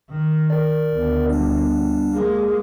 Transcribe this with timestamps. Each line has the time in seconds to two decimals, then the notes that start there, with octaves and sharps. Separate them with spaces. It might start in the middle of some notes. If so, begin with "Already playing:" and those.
0.10 D#3
0.50 A#4 D5
0.94 D2 B3
1.30 G3 D4
2.13 G#3 A#3 G#4